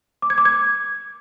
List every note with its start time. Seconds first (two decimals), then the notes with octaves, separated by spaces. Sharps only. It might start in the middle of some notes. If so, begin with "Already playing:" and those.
0.22 D6
0.30 G#6
0.38 D6
0.45 G#6